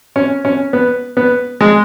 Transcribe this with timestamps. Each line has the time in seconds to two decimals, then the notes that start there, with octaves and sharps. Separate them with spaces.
0.16 C#4
0.45 C#4
0.73 B3
1.17 B3
1.61 G#3